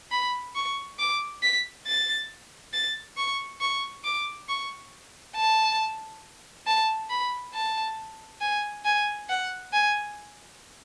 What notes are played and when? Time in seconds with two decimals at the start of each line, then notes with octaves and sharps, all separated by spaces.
0.12 B5
0.55 C#6
0.99 D6
1.43 B6
1.87 A6
2.73 A6
3.17 C#6
3.61 C#6
4.04 D6
4.49 C#6
5.36 A5
6.67 A5
7.10 B5
7.54 A5
8.41 G#5
8.85 G#5
9.29 F#5
9.73 G#5